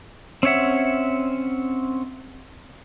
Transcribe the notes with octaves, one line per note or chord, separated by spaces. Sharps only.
C4 C#4 C#5 E5 F#5